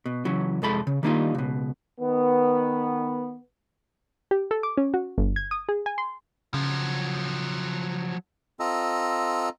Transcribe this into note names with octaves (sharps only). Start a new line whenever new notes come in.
B2
C#3 E3 F#3
C2 F2 G#3 A4 B5
C#3
D#3 G3 A#3 D4 D#4 F4
C#2 B2
D#3 B3
G4
A4
D6
C#4
F#4
G1
G#6
D#6
G#4
G#5
C6
C#3 F3 F#3
C4 F4 A4 D#5 A#5 E6